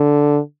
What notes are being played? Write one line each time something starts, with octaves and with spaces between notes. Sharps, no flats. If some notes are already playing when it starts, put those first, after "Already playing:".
Already playing: D3